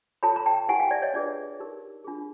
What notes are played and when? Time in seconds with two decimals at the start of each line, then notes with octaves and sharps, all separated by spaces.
0.23 F4 A4 C#5 A5 B5
0.36 A#5
0.46 G5 A5
0.69 E4 G4 A#4 F#5 G#5
0.80 F5 G5
0.91 D5 E5
1.02 C#5 D#5
1.13 D4 F4 G#4 B4 D5
1.60 D#4 G4 A#4
2.04 D4 F4 G#4